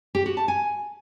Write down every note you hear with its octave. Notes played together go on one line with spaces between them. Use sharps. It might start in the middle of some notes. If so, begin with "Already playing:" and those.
G4
F#4
A5
G#5